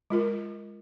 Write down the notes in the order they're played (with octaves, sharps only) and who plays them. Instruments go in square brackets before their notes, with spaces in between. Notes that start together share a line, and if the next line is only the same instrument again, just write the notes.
[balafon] G#3 F4 A#4